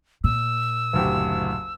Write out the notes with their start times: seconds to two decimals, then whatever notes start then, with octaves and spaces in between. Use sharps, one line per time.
0.24 A#2 E6
0.93 F#1 D2 G4